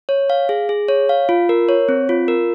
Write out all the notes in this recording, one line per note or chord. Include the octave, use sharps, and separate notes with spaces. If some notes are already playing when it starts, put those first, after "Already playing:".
C#5
F5
G#4
G#4
C#5
F5
F4
A#4
C#5
C4
F4
A#4